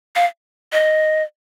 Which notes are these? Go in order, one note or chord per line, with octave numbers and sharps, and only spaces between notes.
F5
D#5